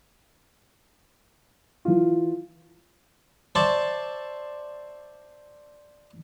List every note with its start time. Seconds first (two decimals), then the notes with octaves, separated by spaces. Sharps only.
1.85 E3 F4
3.55 C5 D5 E5 A5 C6 C#6